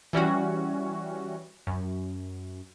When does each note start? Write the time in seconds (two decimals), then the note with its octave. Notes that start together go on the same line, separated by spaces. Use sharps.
0.13 E3 G3 C#4 F#4
1.67 F#2